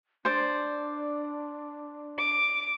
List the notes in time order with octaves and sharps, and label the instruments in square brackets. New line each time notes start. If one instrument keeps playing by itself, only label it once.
[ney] D4 [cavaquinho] C5 D5
[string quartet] D6